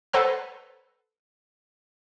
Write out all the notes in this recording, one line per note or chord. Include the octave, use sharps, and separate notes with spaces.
A4 B4 C5 F#5 A#5 E6